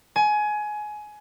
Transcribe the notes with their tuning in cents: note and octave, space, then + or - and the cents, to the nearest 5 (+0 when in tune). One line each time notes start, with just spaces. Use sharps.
G#5 +20